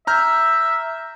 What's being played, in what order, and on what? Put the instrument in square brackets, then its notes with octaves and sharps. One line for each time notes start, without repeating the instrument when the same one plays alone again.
[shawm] E5 [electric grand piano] A#5 F6 G6